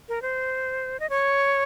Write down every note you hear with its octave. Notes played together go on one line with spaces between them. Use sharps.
A#4
C5
D#5
C#5